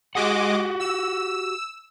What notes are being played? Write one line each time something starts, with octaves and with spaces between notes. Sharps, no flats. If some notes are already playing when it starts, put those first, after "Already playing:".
G#3 F#4 G4 D#5 F#5 D6
E6